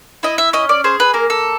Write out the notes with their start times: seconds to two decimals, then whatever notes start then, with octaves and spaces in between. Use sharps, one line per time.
0.23 E4 D#5
0.38 E5
0.53 C#4 D#5
0.69 D5
0.84 G#4 C5
1.00 B4
1.14 A#3 A#4
1.30 A4